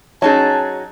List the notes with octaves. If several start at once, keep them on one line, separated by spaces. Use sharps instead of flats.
F#3 C#4 D#4 G#4 A5